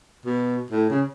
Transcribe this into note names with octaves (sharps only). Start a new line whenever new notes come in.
B2
A2
C#3